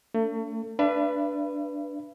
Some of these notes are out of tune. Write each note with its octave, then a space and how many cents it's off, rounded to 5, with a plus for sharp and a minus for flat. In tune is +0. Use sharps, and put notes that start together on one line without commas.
A3 +35 D4 -45
D4 +0 B4 +0 E5 +45